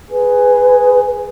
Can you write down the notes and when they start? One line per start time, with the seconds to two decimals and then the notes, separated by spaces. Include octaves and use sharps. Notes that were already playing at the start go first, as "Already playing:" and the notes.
0.11 G#4 B4